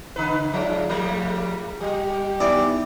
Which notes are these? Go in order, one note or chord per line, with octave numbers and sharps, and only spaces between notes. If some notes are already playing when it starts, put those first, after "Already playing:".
C#3 D#4 B4
F3 G#3 F4 C#5 D5
F3 G3 A3 G#4
G3 G4
E3 B3 D#4 D5